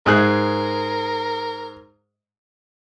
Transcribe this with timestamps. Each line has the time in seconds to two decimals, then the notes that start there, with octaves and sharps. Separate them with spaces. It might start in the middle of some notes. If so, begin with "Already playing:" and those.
0.06 G#2 G#4 A#4 F#6